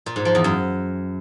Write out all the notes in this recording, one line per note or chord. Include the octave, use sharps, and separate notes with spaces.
A#2
G#2
F3
E2
F#2